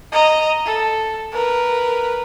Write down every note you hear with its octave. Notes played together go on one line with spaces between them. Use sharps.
D#5 A#5
A4
A#4 B4